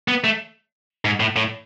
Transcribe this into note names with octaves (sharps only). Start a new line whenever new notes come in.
B3
A3
G#2
A2
A2